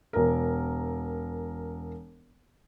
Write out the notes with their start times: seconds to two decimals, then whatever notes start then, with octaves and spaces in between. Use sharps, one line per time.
0.13 E1 A#4